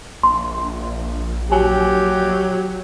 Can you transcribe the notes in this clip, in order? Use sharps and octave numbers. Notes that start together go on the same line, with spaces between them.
A#1 C6
F#3 G4 G#5